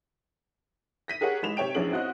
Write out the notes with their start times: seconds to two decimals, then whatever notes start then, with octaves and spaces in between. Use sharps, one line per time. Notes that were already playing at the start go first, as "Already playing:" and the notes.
1.08 A#6 B6 D#7
1.21 G4 G#4 A#4 C#5 F#5
1.43 A1 G#3 B5 E7 F7
1.57 C3 G4 C#5 G5 D7
1.75 A#1 E2 C#4 D4 G#4 F#7
1.91 C4 E4 F#4 C5 D#5